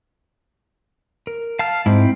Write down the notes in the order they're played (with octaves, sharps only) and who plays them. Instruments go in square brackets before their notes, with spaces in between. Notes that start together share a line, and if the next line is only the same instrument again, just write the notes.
[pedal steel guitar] A#4
F5 A5 F6
[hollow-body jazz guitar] G#2 [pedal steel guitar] C4 C#4 E4